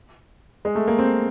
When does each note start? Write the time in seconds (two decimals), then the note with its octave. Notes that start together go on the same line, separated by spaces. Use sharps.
0.65 G#3
0.75 A3
0.87 A#3
0.99 C4